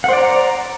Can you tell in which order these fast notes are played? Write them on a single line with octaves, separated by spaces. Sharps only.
F#5 C5 D5 A#5